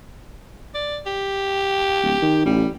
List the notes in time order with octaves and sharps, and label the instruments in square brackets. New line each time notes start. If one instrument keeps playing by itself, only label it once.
[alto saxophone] D5
G4
[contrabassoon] D1
D#3
[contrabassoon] A1 [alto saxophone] G3